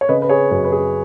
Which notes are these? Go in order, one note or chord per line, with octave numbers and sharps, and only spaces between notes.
C#5
C#3 B4 D#5
B4
G#4 C#5
F#2 B4
B4
G#4